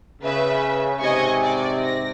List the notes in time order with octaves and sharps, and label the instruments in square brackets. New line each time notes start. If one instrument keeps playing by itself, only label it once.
[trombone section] C#3 [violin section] B4 E5
[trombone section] G#2 C3 [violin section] D#5 G#5 C#6
[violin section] D5
A#6